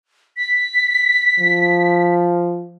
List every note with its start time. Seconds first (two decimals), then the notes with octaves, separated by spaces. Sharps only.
0.37 B6
1.39 F3